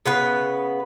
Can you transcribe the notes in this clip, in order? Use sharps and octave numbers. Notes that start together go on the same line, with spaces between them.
C#3 B3 B4